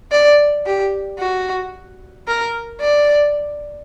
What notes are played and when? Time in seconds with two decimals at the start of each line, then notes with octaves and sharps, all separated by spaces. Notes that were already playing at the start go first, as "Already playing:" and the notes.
0.12 D5
0.66 G4
1.19 F#4
2.28 A#4
2.81 D5